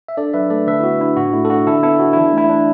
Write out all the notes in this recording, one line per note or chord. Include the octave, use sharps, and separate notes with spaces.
E5
D4 A4 D5
F#3 B4 E5
A3 A4 D5
D3 B4 E5
E4
B3 F#4
D4 E4
A2 F#4
A3 E4
A4
D4 F#4
D3 E4 A4
B3 E4 A4
D4 F#4
E3 E4
A3 E4
D4